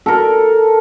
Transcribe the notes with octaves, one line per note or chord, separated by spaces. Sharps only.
A4 A#4